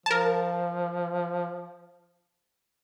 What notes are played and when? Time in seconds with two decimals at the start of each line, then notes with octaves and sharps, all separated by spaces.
0.06 F3 A#4 A5